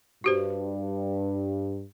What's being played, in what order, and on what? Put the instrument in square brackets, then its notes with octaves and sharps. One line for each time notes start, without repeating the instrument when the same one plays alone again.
[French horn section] G2 [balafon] F#4 G4 C5